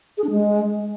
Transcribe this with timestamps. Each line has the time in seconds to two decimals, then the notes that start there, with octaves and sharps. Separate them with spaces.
0.18 G#4
0.24 D4
0.31 G#3